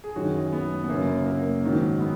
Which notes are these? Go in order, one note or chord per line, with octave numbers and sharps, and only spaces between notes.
G#4
F#2 D#3 F#3 F#4
B3
B3
F#2 C#3 F#3 A#3
A#3
G#2 D#3 F#3
B3